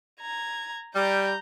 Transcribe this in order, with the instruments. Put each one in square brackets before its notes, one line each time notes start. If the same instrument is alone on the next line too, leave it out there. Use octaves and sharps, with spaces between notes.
[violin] A#5 G#6
[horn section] G3 [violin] A#5 G6